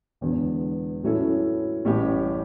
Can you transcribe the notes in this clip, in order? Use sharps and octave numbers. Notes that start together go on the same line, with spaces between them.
E1 E2 D3
A2 F#3 C#4 E4 A4
A1 A2 G3 C#4 G4